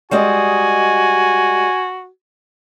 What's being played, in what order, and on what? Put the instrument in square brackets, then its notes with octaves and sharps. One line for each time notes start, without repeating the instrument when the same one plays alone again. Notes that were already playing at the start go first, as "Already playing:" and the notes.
[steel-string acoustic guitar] G3 G#3 D#5 [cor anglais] F#4 [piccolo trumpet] G#5